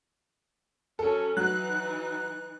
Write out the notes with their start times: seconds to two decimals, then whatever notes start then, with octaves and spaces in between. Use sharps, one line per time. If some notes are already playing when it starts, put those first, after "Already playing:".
0.99 F#3 C#4 A4
1.37 E3 F#3 D#4 F#6